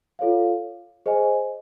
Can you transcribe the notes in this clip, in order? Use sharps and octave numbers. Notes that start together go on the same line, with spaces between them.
F4 A4 C#5 F5
G#4 C5 D#5 G#5